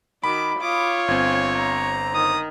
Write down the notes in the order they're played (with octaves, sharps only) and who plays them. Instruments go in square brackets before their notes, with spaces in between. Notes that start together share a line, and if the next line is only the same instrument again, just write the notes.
[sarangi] D#3 [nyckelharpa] F#4 D6 [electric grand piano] B5
[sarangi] F4 [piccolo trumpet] C#5 [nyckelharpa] D6 D#6
[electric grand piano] G1 C4 [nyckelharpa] G#5
[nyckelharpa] A#5
[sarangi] D#3 [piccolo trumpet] D#6